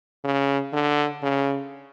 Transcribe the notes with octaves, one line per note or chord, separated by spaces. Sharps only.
C#3
D3
C#3